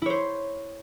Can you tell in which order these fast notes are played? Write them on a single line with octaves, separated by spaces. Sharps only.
E4 C#5 C5